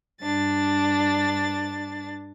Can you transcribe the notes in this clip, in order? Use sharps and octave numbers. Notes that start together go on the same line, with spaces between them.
G2 D4 A6